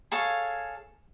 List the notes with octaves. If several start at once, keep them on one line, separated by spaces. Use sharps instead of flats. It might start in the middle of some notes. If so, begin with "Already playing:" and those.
G#4 A4 C#5 F5